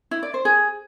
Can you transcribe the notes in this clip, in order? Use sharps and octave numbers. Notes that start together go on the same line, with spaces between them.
E4
D5
C5
G#4